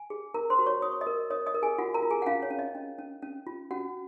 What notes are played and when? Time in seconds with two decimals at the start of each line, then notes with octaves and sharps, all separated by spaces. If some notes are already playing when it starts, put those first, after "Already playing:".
Already playing: G#5
0.10 G#4
0.34 A#4 A#5
0.50 C5 C6
0.59 F#4
0.66 C#5 C#6
0.82 C#5 D#6
0.92 C#6
1.01 D#5 D#6
1.07 A#4
1.30 C#5 D#5 D#6
1.46 D#5 D#6
1.54 A#4
1.62 G#4 G#5
1.78 F4 F#4 F#5
1.94 A#4 A#5
2.02 F4
2.11 G#4 G#5
2.22 F#5
2.26 C#4 F4 F5
2.43 C#5
2.51 C#4
2.59 D#5
2.75 C#4
2.98 C#4
3.22 C#4
3.47 F4
3.71 C#4 F#4 F#5